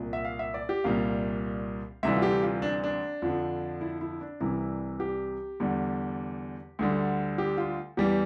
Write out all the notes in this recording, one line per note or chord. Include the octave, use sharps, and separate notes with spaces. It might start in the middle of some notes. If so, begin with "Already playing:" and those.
Already playing: C2 A#2 F3
E5
F5
E5
D5
G4
C2 A#2 G3 F5
D2 C3 E3 G3 E5
F4
G4
F4
D4
D4
F2 D3 F3
E4
E4
D4
C2 C3 E3 G3 E4
G4
E2 D3 G3
D2 D3 G3
G4
F4
E2 E3 G3 G4